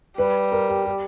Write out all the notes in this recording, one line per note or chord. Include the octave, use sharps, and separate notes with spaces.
G3 B4
A#4
G4
G4